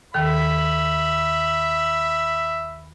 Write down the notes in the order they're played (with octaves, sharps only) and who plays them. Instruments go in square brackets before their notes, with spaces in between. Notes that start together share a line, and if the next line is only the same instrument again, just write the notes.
[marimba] D#2 D#3 A4 [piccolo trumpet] E5 [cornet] B5